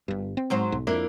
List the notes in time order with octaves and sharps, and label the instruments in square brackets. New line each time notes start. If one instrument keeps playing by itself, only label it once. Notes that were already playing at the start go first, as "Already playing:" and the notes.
[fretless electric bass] G1 G2
C4
[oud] G#2 F#3 C5
[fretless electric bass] B1
[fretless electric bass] F2 [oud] A#3 D4 E4